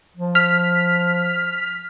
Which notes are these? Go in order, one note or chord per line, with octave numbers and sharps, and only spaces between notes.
F3
F6 B6